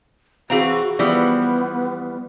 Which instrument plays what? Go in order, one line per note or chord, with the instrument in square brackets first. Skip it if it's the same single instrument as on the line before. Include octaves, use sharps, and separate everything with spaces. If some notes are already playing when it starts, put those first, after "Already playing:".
[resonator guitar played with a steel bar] E3 C4 [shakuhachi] F#4 [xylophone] G#4 F5 A#5
[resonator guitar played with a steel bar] E3 F3 G3 [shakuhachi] B3